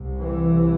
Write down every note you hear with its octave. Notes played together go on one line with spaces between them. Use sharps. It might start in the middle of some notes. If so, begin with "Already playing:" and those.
Already playing: C2 C3
E3